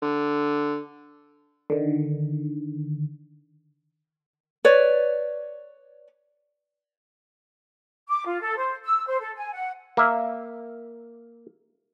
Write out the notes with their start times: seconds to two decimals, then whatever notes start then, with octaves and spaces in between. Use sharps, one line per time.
0.02 D3
1.70 D3 D#3
4.65 B4 C#5 D5
8.08 D6
8.26 F4
8.41 A4
8.57 C5
8.84 E6
9.06 C5
9.20 A4
9.36 G#5
9.53 F#5
9.97 A#3 E5